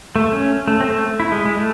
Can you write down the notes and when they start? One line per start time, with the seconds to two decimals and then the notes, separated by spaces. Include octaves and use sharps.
0.16 A3
0.32 C#4
0.68 A3
0.80 C4
0.85 A3
1.20 E4
1.32 G#3
1.45 G#3
1.58 A3